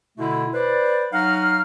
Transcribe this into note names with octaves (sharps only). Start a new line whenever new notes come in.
B2 D3 A3 E4
B4 C5 D5
F#3 D#4 F5 F#5 A#5 F6